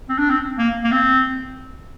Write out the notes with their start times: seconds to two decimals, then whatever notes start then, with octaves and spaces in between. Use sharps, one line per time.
0.09 C4
0.19 D4
0.30 C4
0.59 A#3
0.84 A#3
0.92 C4